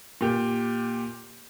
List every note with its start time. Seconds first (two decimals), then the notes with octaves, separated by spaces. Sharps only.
0.21 A#2 G4